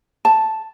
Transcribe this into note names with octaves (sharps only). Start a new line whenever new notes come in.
A5